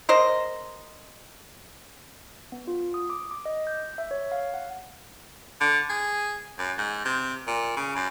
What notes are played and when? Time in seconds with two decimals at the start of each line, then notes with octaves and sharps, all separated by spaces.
0.09 A#4 C5 D#5
2.52 B3
2.67 F4
2.94 D#6
3.10 D6
3.31 D6
3.46 D#5
3.67 G6
3.98 E5
4.11 C#5
4.32 F5
4.54 F#5
5.61 D3
5.90 G#4
6.59 F#2
6.78 G#2
7.05 C3
7.47 A#2
7.76 C#3
7.96 F#2